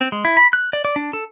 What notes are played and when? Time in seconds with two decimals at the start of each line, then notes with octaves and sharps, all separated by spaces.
0.01 C4
0.12 G#3
0.25 E4
0.37 B5
0.53 F#6
0.73 D5
0.85 D5
0.96 D4
1.13 A4